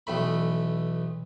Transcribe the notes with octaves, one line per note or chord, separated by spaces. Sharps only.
B1 E2 A3 B5